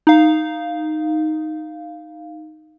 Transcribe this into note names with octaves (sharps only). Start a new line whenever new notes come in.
D#4 F5